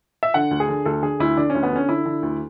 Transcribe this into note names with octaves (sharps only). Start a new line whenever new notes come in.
E5
D3 F#5
D2
G#4
D3
D2 A4
D3 G#4
D2 E4
D3 D4
C#4
D2
B3
D3 C#4
D3 E4
D3
D2